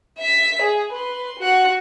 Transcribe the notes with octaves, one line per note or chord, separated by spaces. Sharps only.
E5 B6
G#4
B4 C6
F#4 F#5